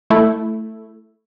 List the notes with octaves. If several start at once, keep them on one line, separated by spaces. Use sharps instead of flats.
A3 E4